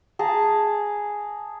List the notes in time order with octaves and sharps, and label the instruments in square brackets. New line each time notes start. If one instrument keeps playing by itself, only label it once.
[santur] G#4 A5 A#5